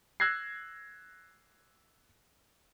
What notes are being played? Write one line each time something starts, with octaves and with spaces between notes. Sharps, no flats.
E6 F#6 G#6 A#6 C7